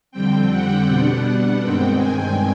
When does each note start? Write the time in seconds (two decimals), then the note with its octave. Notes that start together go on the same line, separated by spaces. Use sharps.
0.12 F2 D3 G3 C4 G5
0.50 F#5
0.86 B2 G3 B3 D4 F#5
1.61 G2 D#3 G#3 C4 G5
1.97 G#5